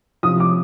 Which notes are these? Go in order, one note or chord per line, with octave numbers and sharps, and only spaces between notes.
C3 F3 D#6
D6